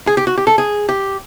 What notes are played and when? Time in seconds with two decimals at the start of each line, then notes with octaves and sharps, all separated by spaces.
0.07 G#4
0.17 G4
0.27 F#4
0.38 G4
0.47 A4
0.58 G#4
0.89 G4